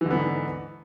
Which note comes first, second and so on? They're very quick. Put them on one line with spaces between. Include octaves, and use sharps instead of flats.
E3 D3 B3 G#2